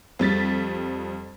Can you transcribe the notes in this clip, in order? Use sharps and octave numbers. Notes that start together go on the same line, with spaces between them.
F2 G3 A6 B6